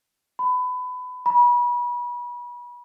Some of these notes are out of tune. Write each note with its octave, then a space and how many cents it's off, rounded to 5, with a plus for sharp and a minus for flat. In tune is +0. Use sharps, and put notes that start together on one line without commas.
B5 +25
B5 -30